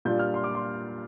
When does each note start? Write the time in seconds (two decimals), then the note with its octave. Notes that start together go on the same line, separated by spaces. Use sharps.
0.05 A#2 G3 D4 F4 G6
0.19 F6
0.34 C6
0.44 D6
0.55 C6